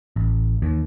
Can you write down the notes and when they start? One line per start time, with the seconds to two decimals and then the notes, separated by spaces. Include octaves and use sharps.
0.16 A1
0.62 D#2